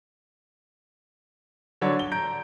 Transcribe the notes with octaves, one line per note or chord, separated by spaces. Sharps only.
D3 F#3 C#5 D5
G7
A#5 G6 D7